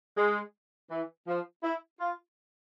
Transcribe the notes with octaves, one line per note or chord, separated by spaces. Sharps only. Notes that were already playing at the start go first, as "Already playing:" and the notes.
G#3
E3
F3
E4
F4